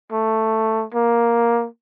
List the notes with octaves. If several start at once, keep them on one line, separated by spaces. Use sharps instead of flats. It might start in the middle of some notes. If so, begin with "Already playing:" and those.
A3
A#3